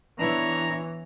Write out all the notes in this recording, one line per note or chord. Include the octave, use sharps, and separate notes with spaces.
E3 B3 D4 E4 C#5 A#5